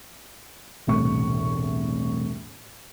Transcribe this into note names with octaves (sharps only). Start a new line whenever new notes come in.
E1 C2 A2 C#6